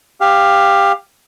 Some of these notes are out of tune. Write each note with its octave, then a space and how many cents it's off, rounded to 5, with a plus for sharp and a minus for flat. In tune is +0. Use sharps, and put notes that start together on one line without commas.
G4 +15 F5 +0